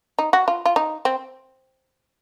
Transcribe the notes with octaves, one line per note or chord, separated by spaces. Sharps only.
D#4
F#4
F4
F4
D#4
C4